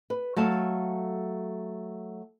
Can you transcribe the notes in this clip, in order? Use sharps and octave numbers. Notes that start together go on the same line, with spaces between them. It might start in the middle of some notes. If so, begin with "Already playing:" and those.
B4
F#3 A3 F5 A5